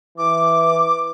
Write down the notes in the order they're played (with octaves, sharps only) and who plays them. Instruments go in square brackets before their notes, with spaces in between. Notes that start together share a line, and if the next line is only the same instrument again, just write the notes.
[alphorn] E3 [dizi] D6